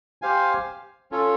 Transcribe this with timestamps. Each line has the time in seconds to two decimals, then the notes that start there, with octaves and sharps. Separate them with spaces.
0.22 G4 C5 F5 G#5
1.11 C#4 F4 A4 C#5